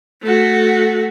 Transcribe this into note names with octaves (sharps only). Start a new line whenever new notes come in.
A3 F#4